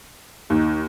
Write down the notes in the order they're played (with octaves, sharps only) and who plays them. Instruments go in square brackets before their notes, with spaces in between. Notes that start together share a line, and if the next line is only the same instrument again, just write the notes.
[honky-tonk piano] D#2 [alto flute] D#4